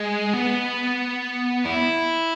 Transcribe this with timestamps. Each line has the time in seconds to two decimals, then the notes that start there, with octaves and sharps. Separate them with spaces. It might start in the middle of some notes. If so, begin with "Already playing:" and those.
Already playing: G#3
0.33 B3
1.65 E4